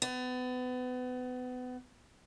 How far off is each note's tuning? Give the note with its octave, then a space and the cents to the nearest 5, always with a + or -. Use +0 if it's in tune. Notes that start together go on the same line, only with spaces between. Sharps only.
B3 +30